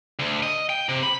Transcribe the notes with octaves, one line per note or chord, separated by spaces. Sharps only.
D2
D#5
G5
C3
B5